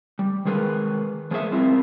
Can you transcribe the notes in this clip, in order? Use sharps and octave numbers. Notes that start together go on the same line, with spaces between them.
G3
D#3 G#3 G#4 A#4 B4
F3 G#3 A#3 G#4 E5
G3 C4 D4 E4 F4 A#4